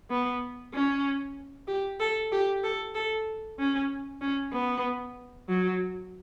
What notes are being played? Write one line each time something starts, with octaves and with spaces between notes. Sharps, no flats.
B3
C#4
G4
A4
G4
A4
A4
C#4
C#4
B3
F#3